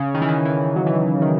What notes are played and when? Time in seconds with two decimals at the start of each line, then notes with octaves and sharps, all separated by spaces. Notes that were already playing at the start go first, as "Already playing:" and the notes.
Already playing: C#3
0.15 D#3
0.22 E3
0.28 D#3
0.45 E3
0.76 F#3
0.86 E3
0.97 D#3
1.07 E3
1.22 D#3